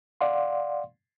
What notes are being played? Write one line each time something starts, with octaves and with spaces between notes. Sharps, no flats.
D5 F5 F#5 C6